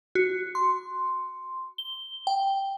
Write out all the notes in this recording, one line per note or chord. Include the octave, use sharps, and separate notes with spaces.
F#4
C6
G7
G5